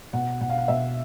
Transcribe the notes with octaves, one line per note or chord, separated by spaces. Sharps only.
B2 F#5
B2 F#5
F5
F#5
B2 E5